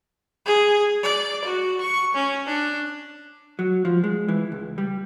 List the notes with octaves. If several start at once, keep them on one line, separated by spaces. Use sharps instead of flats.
G#4
D5
F#4
C#6
C#4
D4
F#3
F3
G#3
E3
C#2
G3